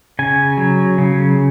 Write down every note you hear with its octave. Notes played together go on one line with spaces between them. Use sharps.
C#3 G#5
F#3
C#3